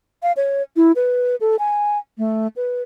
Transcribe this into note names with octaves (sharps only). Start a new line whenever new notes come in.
F5
C#5
E4
B4
A4
G#5
A3
B4